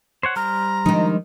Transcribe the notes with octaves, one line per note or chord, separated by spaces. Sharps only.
C5 C#5 F#5
G3 C5 A#5 F6
D#3 F3 G#3 D4 D#4